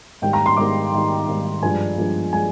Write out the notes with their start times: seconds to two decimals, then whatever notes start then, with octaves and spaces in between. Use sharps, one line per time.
0.22 G#2 D#3 G3 G5
0.33 A#5
0.46 C6
0.57 G#2 D#3 G3 D6
0.92 G#2 D#3 G3
1.28 G#2 D#3 G3
1.63 G2 F3 G#3 D4 G#5
1.97 G2 F3 G#3 D4
2.33 F3 G#3 D4 G#5